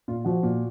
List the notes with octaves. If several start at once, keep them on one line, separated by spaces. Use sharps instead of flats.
A#2 F4
F3 F#4
A#2